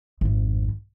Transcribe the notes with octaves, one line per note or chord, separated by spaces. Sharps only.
G#1 F2